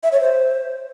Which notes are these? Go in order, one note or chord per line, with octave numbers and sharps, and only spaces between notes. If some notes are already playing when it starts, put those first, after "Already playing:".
E5
C#5
C5